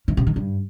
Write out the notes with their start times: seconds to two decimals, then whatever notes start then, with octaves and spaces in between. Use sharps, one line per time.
0.08 D#3
0.17 C3
0.27 D#3
0.36 G2